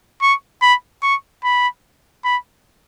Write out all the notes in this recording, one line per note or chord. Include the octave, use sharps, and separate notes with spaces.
C#6
B5
C#6
B5
B5